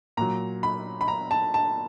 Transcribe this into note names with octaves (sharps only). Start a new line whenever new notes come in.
A#2 F#3 A#5
B5
B5
A#5
A5
A5